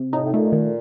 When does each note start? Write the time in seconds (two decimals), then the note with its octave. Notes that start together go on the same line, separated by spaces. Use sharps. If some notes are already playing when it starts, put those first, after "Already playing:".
Already playing: C3
0.13 A2 D#4
0.25 A2
0.33 A#2 A3
0.52 D#3